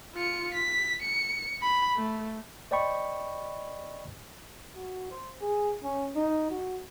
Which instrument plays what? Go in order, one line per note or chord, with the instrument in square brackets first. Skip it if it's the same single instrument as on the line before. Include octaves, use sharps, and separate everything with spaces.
[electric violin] F4 C#7
B6
C#7
B5
A3
[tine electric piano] C5 D5 D#5 G5 B5 C#6
[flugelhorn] F#4
C5
G#4
C#4
D#4
F#4